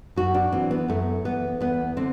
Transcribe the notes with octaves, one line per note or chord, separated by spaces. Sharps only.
F#2 F#4
D4
E3 C4
B3
F#2 A3
E3 B3
E2 B3
D3 C4